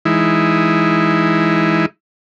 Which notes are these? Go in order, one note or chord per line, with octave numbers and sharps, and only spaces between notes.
E3 G#3 D#4 E4